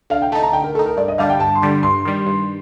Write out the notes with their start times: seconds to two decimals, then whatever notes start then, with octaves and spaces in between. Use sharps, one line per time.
0.10 D3 F5
0.22 G5
0.32 A3 D#4 A5
0.43 A#5
0.53 D3 G5
0.64 A#4
0.75 A3 D#4 A4
0.86 A#4
0.97 G2 D5
1.08 D#5
1.18 D3 G3 D4 F5
1.30 G5
1.40 G2 A5
1.55 C6
1.62 D3 G3 D4
1.83 G2 C6
2.05 D#3 G3
2.26 G2